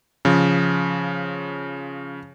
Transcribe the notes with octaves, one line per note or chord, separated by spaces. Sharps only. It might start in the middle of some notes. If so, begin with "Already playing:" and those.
C#3 F3